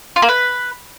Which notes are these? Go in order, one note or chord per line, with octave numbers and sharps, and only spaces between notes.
F4
A#3
B4